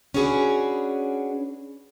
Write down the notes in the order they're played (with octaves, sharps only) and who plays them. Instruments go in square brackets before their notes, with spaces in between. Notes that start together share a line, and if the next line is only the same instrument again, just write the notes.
[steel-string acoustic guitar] C#4 D4 F#4 G#4 B4